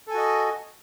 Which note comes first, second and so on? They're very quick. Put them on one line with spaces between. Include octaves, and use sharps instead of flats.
A4 G#5 F#4 D#5